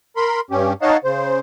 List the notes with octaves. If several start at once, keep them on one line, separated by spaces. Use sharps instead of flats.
A#4 B5 C6
G2 C#4 G4
D#4 C#5 D#5 F5 F#5 A5
C#3 C5